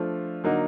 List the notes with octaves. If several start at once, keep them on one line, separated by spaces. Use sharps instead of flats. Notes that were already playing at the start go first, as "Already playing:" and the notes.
Already playing: F3 A3 D4 F4 A4
D3 F#3 A#3 D#4